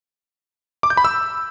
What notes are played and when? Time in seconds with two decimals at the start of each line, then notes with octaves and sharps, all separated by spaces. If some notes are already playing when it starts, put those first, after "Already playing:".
0.83 D6
0.90 G6
0.97 B5
1.04 E6